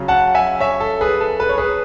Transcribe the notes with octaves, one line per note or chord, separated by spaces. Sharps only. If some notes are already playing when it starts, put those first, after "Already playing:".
Already playing: C#3 F#3 C#4
F#5 A5
E5 G#5
C#5 E5
A4
G#4 B4
A4
B4
C#5
G#4 B4